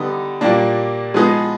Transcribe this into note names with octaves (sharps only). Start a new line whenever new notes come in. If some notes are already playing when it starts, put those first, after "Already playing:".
Already playing: D3 G3 B3 D#4
A#2 G3 A#3 D4
F3 G#3 B3 D#4 G#4